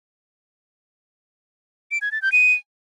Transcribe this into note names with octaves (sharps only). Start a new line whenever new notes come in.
D7
G#6
A6
G6
D#7